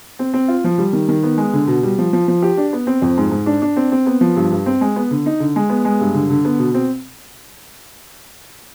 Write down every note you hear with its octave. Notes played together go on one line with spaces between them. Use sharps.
C4
C4
F4
F3
G3
D#3
D#3
B3
G#3
D3
B2
G3
F3
F3
F3
G4
D4
B3
C4
F2
G#2
G#2
D4
D4
C4
C4
B3
F3
G2
G2
C4
G#3
B3
D3
D#4
D3
G#3
B3
G#3
G2
D3
D3
B3
B2
C4